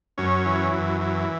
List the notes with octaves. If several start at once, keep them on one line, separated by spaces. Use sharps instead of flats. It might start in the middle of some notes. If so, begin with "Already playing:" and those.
F#2 C#4
E3
F#2
E3